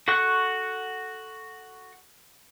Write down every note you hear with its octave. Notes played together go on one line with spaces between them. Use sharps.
F#4 A4 F#5 C#6 F#6